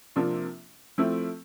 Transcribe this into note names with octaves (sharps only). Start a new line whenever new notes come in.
C3 F3 A#3 D4 F4
F3 A3 C4 E4